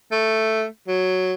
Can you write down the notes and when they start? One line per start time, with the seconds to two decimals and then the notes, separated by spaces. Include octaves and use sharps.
0.12 A3
0.88 F#3